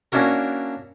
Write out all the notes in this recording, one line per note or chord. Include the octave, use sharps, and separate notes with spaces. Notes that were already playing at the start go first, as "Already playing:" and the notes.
A#3 C#4 D4 E4 F#4 A#4